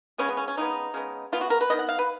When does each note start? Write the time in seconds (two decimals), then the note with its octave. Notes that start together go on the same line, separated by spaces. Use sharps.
0.18 C#3 G#3 B3 C#4
0.29 B3
0.37 C#4
0.48 C#4
0.57 C#3 G#3 B3 D#4
0.94 C#3 G#3 B3
1.32 C#3 G#3 B3 F4
1.41 F#4
1.50 A#4
1.61 B4
1.70 D#3 G#3 B3 D#5
1.79 F#5
1.89 F5
1.99 B4